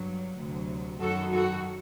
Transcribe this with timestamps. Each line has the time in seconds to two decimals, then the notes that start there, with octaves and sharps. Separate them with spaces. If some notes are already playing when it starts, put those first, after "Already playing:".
Already playing: G2 F#3
0.35 D2 C3 F#3
0.99 F#2 D#3 F#3 F#4 A4
1.31 F#4 A4